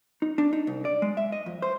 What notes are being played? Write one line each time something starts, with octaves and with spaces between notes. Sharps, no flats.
D#4
D4
D#4
C2
D5
G#3
E5
D#5
F2
C5